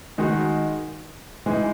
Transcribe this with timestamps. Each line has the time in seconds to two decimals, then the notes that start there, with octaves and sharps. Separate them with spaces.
0.18 D#3 G#3 D#4 F#4
1.46 E3 G#3 D#4